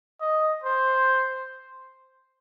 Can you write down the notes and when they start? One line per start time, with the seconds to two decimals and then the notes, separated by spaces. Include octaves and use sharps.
0.20 D#5
0.64 C5